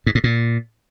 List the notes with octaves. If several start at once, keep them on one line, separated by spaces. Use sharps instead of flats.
G#2
A2
A#2